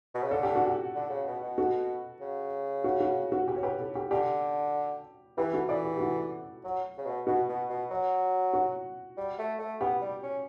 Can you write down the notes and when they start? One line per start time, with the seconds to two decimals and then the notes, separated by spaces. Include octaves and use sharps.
0.14 B2
0.23 C#3
0.31 D3 A4
0.43 G4
0.56 F#4
0.67 G4
0.95 D3
1.10 C#3
1.27 B2
1.43 B2
1.58 F#4 A4
2.21 C#3
2.84 F#4
3.00 F#4
3.32 F#4
3.48 G4
3.56 C#5
3.63 G4 B4
3.80 A4 C#5
3.95 G4
4.11 D3 G4
5.37 E3 G4 B4
5.53 F#4 A4
5.69 E3 B4 D5
5.85 G4
5.97 G4
6.00 F#4 A4
6.64 F#3
6.98 C#3
7.06 B2
7.27 B2 F#4
7.49 B2
7.69 B2
7.91 F#3
8.53 F#4
9.17 G3
9.39 A3
9.59 A3
9.81 B3 G4
10.02 G3
10.23 C#4